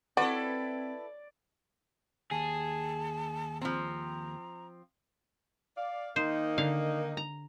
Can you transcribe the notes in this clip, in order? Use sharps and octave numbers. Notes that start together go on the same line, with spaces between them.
C4 E4 F#4 A4 B4 D5
D#2 G#4 A5
F3 C4 A#5
D5 F5
D#3 A#3 D#4 C5
D3 F5
A#5